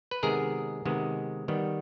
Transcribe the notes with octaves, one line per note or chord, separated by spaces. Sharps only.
B4
C3 D#3 G#3 B3 G#4 A#4
C3 D#3 G#3 B3
D#3 G3 B3